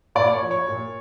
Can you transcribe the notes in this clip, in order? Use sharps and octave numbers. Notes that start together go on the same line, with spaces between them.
A#2 D5
C#5
F3
C#5
A#2